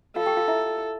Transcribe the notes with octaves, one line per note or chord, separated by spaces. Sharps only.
F4 A4 F5
G4 G5
F4 F5
E4 E5